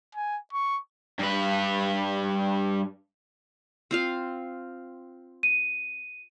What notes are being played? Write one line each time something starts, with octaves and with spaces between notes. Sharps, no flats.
G#5
C#6
G2 B4
C4 F4 F5
D#7